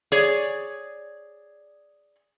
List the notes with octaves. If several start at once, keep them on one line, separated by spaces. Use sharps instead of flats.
G#4 C#5 D5